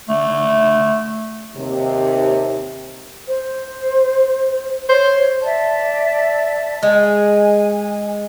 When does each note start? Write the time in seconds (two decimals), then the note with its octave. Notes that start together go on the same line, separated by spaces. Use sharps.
0.09 A3
1.55 D#2 C3
3.28 C5
4.89 C5 C#5
5.43 D5 E5 A5
6.83 G#3 G#5